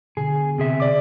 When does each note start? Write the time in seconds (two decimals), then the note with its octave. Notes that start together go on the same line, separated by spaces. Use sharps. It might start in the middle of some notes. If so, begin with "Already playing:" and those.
0.17 B2 D3 G#4
0.58 C3 G#4 E5
0.80 D5 D6